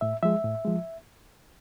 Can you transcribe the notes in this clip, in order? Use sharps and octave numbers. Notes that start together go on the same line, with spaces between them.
A2 E5
F3 G#3 E5
A2
F3 G#3